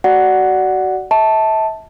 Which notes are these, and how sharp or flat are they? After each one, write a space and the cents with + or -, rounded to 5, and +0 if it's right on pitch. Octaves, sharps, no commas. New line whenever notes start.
F#4 +25 D5 +0 F#5 +0
E5 -35 A5 +0